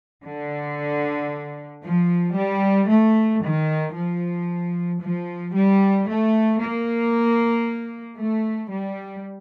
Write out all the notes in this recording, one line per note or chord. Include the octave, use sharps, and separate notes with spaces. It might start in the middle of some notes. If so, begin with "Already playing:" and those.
D3
F3
G3
A3
D#3
F3
F3
G3
A3
A#3
A3
G3